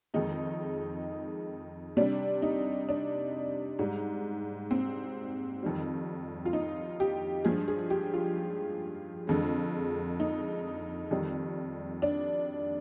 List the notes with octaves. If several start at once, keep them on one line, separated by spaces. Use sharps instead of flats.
F2 D#3 G#3 D#4
C3 G3 D4
D#4
D4
G#2 G3
C4
F2 D#3 G3
F4
D#4
G4
G2 F3 G#3 G#4
G#4
G4
F4
F2 D3 G#3
D#4
F2 D#3 G3
D4